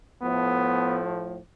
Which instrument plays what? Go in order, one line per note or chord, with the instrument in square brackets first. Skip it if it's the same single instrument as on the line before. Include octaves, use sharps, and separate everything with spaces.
[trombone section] A2 F3 A3 B3